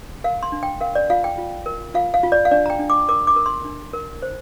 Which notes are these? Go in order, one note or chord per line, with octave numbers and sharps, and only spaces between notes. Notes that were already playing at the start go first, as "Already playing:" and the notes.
A#4 F5
C6
D4
G5
A#4 F5
D5
F4 F5
G5
F4
A#4
F4 F5
F5
F4
D5
F5
D4 D5
A#5
G5
D4
D6
A#4 D6
D6
A#4
C6
D4
A#4
C5